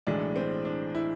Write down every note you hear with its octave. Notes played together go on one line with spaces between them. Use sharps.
B1 A2 E3 G#3 D4
C4
D4
E4